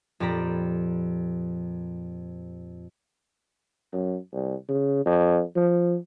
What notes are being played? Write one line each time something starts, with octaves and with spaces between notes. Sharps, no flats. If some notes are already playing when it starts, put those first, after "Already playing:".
F2 A#2 G4 D5 A#5 B5
F#2
C2
C#3
F2
F3